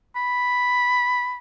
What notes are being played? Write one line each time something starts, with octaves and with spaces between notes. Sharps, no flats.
B5